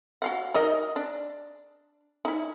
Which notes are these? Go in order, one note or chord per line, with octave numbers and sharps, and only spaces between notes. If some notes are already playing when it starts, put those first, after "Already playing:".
F#4 F5 F#5
D#4 A#4 D#5
D4
D#4 E4